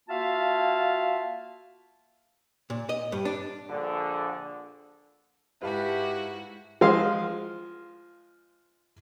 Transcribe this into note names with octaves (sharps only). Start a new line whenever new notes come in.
A#3 F4 F#4 E5 F5 A5
A#2
D#5
G2
D4
A#1 D3
G#2 E4 F#4 G4 B4 F5 A5
F3 G#3 F5 C6